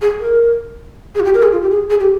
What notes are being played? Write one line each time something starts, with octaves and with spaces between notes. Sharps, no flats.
G#4
A#4
G#4
F4
G4
A#4
G#4
F4
G4
G#4
G#4
G4